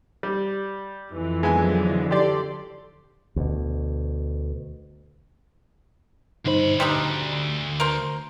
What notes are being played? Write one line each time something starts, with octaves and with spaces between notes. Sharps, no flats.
G3
F2 E3
D3 F3 F#3 G#3 B3 G#5
G4 A4 D5 C6
D2 B2
D2 G2 D#4 C5 B5
G3 D4 D#4 C6
A#4 C5